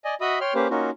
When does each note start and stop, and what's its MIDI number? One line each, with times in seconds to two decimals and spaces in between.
0.05 0.15 74
0.05 0.15 75
0.05 0.15 80
0.21 0.39 66
0.21 0.39 75
0.21 0.39 76
0.21 0.39 83
0.21 0.39 87
0.41 0.54 73
0.41 0.54 79
0.41 0.54 84
0.41 0.54 89
0.55 0.68 58
0.55 0.68 61
0.55 0.68 67
0.55 0.68 71
0.55 0.68 72
0.70 0.90 58
0.70 0.90 61
0.70 0.90 63
0.70 0.90 65
0.70 0.90 66